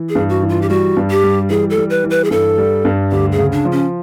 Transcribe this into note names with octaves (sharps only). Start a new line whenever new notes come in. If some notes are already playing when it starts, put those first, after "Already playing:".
Already playing: E3
G#4
G2
F#4
E3
F4
G4
G3 F#4
G2
G4
G3
E3 G#4
A4
G3
B4
E3
B4
G#4
G2 A4
G3
G2
D2 G4
G#4
C#3
D4
F3
C#4